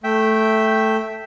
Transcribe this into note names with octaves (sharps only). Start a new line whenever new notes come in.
A3 E5 G5